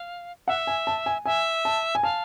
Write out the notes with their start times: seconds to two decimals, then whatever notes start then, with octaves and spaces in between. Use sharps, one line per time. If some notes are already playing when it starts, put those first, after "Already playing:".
Already playing: F5
0.48 E5 F#5
0.67 G#5
0.87 A5
1.06 G#5
1.26 E5 G#5
1.65 A5
1.95 G#5
2.03 F5 A5